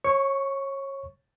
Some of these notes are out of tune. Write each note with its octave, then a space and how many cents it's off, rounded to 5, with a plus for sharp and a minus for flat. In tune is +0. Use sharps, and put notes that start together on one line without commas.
C#5 -25 C#6 +5